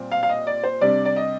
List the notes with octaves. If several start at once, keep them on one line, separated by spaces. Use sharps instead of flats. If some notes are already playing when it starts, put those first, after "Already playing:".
Already playing: A#2 G3 C4
F5
F5
D#5
D5
C5
C3 G3 D4 D5
D5
D#5